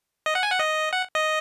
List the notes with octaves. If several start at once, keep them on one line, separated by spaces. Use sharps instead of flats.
D#5
F#5
G#5
F#5
D#5
F#5
D#5